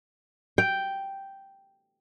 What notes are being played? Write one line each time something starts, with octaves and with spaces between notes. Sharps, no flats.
G5